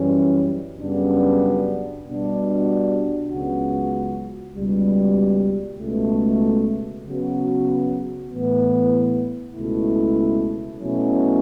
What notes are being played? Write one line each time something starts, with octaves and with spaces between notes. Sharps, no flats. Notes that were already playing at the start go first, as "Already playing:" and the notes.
Already playing: F#2 E3 G3 C#4
F#2 C#3 G3 B3 D4
B2 G3 D4 F#4
C#2 C#3 F#3 B3 F#4
C#2 B2 G3
C#2 B2 A3
C#3 F#3 B3 F#4
A2 E3 B3
C#2 B2 A3 E4
B2 F#3 A3 C#4 E4